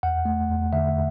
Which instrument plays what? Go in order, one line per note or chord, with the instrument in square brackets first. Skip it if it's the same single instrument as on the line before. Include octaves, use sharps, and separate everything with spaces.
[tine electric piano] E2 F#5
A3
E2
D3 E5